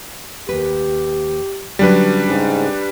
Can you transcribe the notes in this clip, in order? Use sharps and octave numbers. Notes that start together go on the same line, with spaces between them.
D#2 G4 B4
D3 F#3 G3 C#4 D4 B4
G#2 C#3